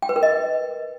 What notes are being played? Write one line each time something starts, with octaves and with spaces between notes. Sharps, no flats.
G5
B4
A#4
D#5